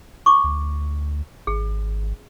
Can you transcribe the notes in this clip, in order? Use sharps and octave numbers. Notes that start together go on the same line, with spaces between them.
C#6 D6
D2
G#1 G#4